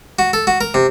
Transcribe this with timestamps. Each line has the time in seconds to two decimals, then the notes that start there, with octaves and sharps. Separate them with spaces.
0.19 F#4
0.33 A4
0.47 F#4
0.61 A#4
0.74 C3